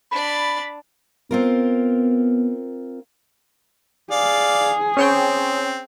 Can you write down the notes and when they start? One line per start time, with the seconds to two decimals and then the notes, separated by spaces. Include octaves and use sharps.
0.11 D4 D5 B5
1.31 B3 C4 F4 A#4
4.11 G#4 D5 F5
4.97 C4 C#4 C#5 G5